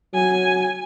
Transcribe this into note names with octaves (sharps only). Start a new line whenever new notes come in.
F#3 G#5